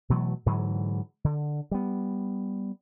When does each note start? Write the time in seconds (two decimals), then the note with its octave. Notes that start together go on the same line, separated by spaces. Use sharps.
0.10 B2 E3 F#3 A3
0.46 G#2 D3 E3 F#3
1.24 D3
1.71 G3 B3